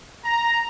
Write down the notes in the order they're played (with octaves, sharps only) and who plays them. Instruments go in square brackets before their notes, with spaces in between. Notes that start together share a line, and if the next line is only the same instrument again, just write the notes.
[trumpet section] A#5